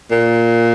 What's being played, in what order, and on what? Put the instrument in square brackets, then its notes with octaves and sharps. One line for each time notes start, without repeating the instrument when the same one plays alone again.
[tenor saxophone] A#2